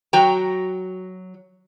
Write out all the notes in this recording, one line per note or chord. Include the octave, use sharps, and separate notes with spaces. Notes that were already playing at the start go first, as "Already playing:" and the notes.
F#3 F#4 G5 A#5